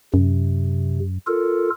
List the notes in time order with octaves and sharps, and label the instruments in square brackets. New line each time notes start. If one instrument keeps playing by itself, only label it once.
[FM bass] F#2 [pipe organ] C3
[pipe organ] F4 A4 A#4